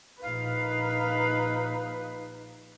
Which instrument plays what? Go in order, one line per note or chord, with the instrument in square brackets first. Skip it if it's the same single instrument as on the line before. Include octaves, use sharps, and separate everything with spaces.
[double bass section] A#1 [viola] D#4 B4 [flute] F5